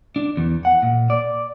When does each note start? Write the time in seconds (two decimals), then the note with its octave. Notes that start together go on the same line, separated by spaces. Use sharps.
0.16 D4
0.37 E2
0.65 F#5
0.82 A#2
1.10 D5